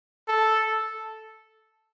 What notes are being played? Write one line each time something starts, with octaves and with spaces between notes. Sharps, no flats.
A4